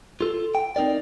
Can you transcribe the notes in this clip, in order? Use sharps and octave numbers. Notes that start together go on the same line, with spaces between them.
F4 A4
G5
C4 D#4 A#4 D5